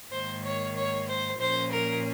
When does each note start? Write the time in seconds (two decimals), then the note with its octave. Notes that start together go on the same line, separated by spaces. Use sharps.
0.11 G#2 D#3 A#3 C5
0.43 C#5
0.76 C#5
1.07 C5
1.39 A#2 F3 A#3 C#4 C5
1.71 A#4